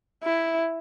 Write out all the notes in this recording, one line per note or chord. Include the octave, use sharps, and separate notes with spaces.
E4